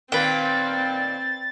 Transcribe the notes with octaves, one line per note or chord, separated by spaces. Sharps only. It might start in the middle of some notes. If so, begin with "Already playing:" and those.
A#2 D#3 A#3 C4 B4 G5 A6